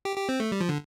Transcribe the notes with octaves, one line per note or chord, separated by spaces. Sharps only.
G4
G4
C4
A3
G3
F3
D3